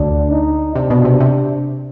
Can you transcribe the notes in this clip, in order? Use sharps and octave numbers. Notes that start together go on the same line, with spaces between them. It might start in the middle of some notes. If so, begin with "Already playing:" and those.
Already playing: D2 D3 D4
D#4
C3 D4
B2
C3
C3